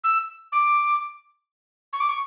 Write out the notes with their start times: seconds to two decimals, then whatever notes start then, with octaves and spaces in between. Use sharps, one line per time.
0.04 E6
0.52 D6
1.93 C#6
2.00 D6
2.09 C#6